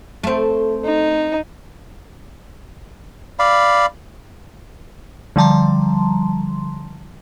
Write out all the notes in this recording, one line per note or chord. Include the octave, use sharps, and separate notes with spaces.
A3 C4
D#4
D5 F5 B5
D3 F3 G3 A5 A#5 C6